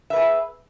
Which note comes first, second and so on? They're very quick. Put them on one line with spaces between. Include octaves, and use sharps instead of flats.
E5 B4 G#4